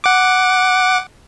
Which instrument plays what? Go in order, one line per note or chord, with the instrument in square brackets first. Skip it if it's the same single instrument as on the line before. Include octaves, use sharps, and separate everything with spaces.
[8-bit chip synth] F#5 D6